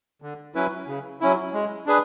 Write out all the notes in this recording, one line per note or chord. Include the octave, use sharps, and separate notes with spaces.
D3
F#3 C#4 E4 B4
C#3
F#3 C#4 E4
G#3
D4 G#4 B4